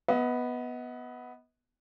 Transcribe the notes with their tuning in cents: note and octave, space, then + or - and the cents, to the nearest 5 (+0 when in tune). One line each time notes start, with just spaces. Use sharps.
B3 +0 D#5 +40